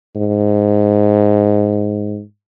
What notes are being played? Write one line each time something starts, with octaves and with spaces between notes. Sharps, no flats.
G#2